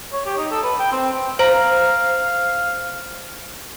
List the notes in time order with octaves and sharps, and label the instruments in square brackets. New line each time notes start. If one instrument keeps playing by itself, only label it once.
[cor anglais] C#5
G4
D#4
A4
B4
G5
C4
[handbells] C5 [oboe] F5 [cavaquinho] A#5